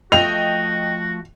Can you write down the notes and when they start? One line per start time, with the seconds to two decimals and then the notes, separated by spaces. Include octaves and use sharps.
0.12 F3 A3 F#4 D#5 G5 F7